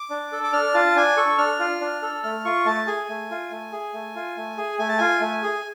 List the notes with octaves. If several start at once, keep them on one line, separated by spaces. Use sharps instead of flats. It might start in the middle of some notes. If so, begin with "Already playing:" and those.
Already playing: D6
D4
A4
D6
D4 F6
F4 A5
D4 G#5
A4 C#6
D4 F6
F4
D4
A4
A3 F6
F4 C#6
A3 A5
G#4 G#5
A3
F4
A3
G#4
A3
F4
A3
G#4
A3 G#5
A5
F4 G#5
A3
G#4